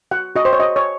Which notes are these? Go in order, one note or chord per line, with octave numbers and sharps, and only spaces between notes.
F#4 F#5
F#4 D#5
C5
C#5
F#4 D#5
C#5